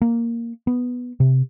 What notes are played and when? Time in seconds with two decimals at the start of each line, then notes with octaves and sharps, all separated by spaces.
0.02 A#3
0.67 B3
1.20 C3